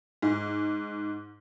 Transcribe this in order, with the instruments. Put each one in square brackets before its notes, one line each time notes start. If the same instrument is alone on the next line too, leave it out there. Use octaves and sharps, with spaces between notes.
[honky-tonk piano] G#2